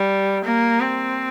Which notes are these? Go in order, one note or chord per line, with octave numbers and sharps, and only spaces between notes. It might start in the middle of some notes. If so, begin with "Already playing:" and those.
Already playing: G3
A#3
C4